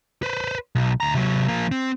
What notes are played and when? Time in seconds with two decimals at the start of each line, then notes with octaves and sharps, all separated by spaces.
0.23 B4 C5
0.75 B1
1.00 D2 A#5
1.15 C3 F#3
1.48 F3 A#3
1.71 C4